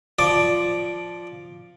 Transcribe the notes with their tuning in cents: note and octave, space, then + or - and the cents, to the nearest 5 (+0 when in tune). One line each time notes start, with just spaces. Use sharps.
F3 +0 D5 +0 D6 +5